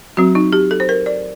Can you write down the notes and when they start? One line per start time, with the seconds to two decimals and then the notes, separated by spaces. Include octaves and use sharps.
0.17 F#3 C4 F#4
0.35 D#4
0.53 G4
0.71 A4
0.80 C5
0.89 A#4
1.06 D5